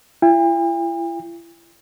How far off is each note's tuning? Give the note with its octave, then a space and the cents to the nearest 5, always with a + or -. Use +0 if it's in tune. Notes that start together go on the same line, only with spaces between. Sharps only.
E4 +40 G5 +45